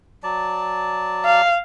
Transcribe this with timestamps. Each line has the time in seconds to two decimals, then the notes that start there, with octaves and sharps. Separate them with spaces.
0.23 F#3 D5 A5
1.26 F5